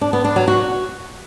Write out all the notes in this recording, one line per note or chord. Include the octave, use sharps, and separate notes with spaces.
D4
B3
D4
F#3
F#4